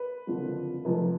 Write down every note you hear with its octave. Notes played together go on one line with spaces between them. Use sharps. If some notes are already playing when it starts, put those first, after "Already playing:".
Already playing: B4
F#1 F2 D3 F3
F1 F2 F3